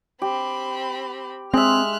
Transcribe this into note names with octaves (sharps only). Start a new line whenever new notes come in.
C4 G4 B5
G#3 C4 E5 F6 F#6